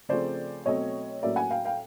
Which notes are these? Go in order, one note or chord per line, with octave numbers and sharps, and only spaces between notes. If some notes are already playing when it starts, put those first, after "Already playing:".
C#3 F3 A3 C4 C5 D5
B2 F#3 A3 C4 C#5 D#5
A2 F#3 A#3 C#4 D5 E5
F#5 G#5
F5 G5
F5 G5